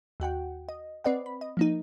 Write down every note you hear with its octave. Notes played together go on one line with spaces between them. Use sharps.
D#2 F#4 F#5 G5
D#5
C4 B4 D5 D#5 F#5
B5
D#5
F3 A#3 D#4